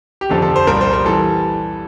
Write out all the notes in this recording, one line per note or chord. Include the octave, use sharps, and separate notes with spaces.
G4
G1 F2 C3 F3 A4
A4
C5
C2 A#2 G3 A#4
C5
A#4
E3 G3 A4